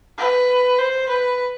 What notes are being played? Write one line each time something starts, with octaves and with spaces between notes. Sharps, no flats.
B4
C5
B4